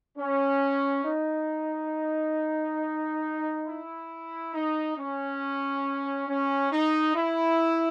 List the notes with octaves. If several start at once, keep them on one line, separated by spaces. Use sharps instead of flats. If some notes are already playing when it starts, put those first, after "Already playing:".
C#4
D#4
E4
D#4
C#4
C#4
D#4
E4